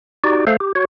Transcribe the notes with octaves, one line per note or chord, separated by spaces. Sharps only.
D#4 F#4 G4 D5
A3 A4 C5 F5
G4
F#4 C#5